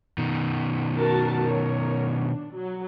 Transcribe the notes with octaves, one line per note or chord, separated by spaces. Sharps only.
B2 D#3
F#4 A#4 A5
A#4 C#5
D4
F#3